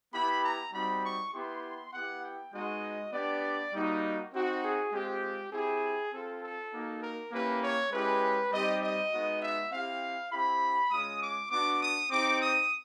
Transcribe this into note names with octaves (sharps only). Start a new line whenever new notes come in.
B3 E4 G4 B5
A#5
G3 C4 D#4 F#4 B5
C#6
B3 E4 G4 C6
B3 E4 G4 F#5
G5
G#3 B3 D#4 F#4 D#5
B3 D4 G4 D5
G3 A#3 D#4 F#4
C4 D#4 F#4
G#4
G#3 C4 F4 G4
C4 E4 G4 G#4
C4 F4 A4
A4
A#3 D#4 F#4
A#4
A#3 C#4 E4 G4 B4
C#5
G#3 C#4 E4 G4 B4
G3 C4 D#4 G4 D#5
D#5
G#3 B3 D#4 F#4
E5
C4 E4 G4 F5
C4 E4 G4 B5
G#3 C#4 F4 D#6
D6
B3 D4 F#4 D6
D#6
C4 D#4 G4 D6
D#6